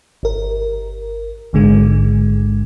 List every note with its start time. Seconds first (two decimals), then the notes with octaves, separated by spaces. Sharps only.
0.23 G1 A#4
1.53 A1 G#2 D3 G#3